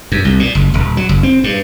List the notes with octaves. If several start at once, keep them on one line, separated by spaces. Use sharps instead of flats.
F#2
C2
A#2
F#1
D#1
F#3
F#1
C4
G2